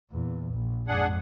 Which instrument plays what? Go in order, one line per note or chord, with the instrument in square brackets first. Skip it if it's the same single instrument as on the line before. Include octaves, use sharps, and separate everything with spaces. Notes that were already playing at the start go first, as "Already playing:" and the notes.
[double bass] E2 A#2
A#1
[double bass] F2 G#2 [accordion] D4 G#4 F#5